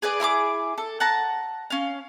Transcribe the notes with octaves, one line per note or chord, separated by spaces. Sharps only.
G#4 B4 D5 G#5
E4 G#4 C6 D6
A4
F#5 A5 A#5
C#4 F5